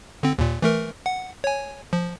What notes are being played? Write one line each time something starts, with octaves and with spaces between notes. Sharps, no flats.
D3 C4
D#2 A#2
E3 A3 A#4
F#5
C#5 G#5
F3